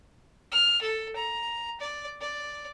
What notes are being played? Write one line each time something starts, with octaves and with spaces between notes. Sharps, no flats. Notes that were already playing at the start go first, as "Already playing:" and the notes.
F6
A4
A#5
D5
D5